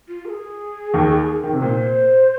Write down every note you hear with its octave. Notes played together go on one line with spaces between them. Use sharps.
F4
A#4
G#4
D#2 D#3
D#3
C3
A#2 C5